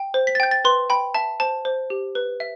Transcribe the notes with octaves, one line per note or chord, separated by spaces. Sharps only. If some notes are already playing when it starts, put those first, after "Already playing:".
Already playing: G5
C5
B6
A6
G5 G6
A6
B4 C6
G5 B5
E5 A5
C5 A5
C5
G4
B4
E5